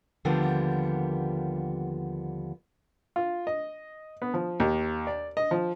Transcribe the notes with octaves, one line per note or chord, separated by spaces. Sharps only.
D#2 D3 F3 G3 A#3 B3
F4
D#5
B3
F3
D#2
D5
D#5
F3